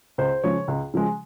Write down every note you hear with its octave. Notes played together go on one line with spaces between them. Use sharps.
C#2 C5
C#3 F3 G#3 C#5
C#2
C#3 F3 G#3